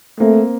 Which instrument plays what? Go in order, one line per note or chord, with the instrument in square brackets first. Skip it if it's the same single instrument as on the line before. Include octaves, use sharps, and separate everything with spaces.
[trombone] A3 [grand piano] A#3 C4